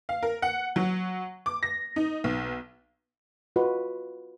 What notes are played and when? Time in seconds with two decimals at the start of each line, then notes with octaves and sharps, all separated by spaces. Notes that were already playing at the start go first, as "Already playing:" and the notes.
0.09 F5
0.23 A#4
0.42 F#5
0.76 F#3
1.46 D6
1.63 A#6
1.96 D#4
2.24 B1
3.56 F4 F#4 B4 D#5